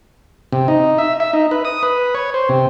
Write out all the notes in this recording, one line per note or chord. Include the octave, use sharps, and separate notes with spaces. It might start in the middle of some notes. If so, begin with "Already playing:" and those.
C3
D#4
E5
E5
D#4
B4
D#6
B4
C#5
C5
C3